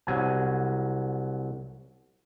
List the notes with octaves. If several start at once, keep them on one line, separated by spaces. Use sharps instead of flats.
C2 F#3 G#5